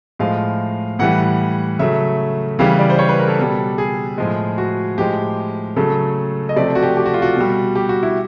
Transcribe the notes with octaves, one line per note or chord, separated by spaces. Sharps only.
A2 F3 G#3 F5
A2 E3 G3 F#5
C#3 F#3 A3 E5
C#3 E3 G3 F5
D5
C5
C#5
B4
A#4
A4
B2 G3
G#4
A2 F3 G#3
F#4
A2 F3 G#3 G4
C#3 F#3 A3 A4
D#5
C3 F3 A3 D5
F#4
G4
G4
F#4
F4
F#4
B2 G3
G4
F#4
E4